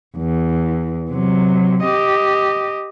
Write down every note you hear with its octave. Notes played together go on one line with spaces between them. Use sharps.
E2
C3 F#3
G4 D#5